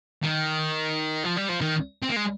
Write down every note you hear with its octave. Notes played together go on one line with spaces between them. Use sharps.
D#3
F3
G3
F3
D#3
C4
A#3
G#3